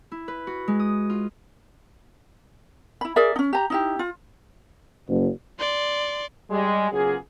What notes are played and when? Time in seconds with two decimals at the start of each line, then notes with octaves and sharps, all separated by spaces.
0.12 E4
0.28 B4
0.47 F#4
0.68 G#3
0.79 D#6
1.10 F4
3.01 E4 B5
3.16 G#4 A#4 D5 E5
3.36 C#4 D#4
3.53 G4 A#5
3.70 D#4 E4 G4
3.99 F4
5.08 F#1
5.59 D5 C6
6.50 G3 G#3
6.90 C#3 F#3 A#3 B3 F4 G#4